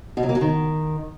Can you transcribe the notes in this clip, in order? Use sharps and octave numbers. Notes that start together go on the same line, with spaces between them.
B2
F#3
A#3
F#3
D#3